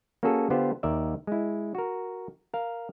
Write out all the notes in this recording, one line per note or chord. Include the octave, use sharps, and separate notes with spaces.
A#3 C#4 F#4 G#4 A4
D3 B3 F4 G4 C5
D#2 A#4 D5 E5
G#3 E4
F#4 A#4
A#4 F5